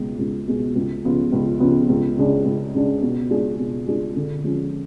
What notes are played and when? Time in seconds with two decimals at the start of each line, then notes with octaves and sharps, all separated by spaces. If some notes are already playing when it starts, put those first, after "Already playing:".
Already playing: C#2 B2 G#3
0.19 C#2
0.48 B2 G#3
0.75 C#2
1.04 C#3 F3 B3 F4
1.33 C#2
1.60 C#3 F3 B3 F4
1.89 C#2
2.17 C#3 G#3 D4
2.45 C#2
2.74 C#3 G#3 D4
3.02 B2
3.30 G#3 D4 F4 G#4
3.59 B2
3.87 G#3 D4 F4 G#4
4.16 D3
4.44 F3 G#3 C#4